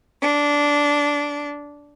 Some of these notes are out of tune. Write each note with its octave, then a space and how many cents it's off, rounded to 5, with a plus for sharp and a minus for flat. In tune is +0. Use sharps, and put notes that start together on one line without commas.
D4 -15